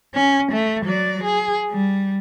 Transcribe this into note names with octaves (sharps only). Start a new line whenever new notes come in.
C#4
A3
F#3 D5
G#4
G3